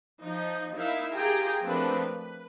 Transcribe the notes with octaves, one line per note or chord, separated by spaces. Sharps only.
F3 D#4
D#4 E4 A#4 E5 F5
F4 G4 G#4 G5 A#5
F3 A3 C4 D4 A#4 B4
B4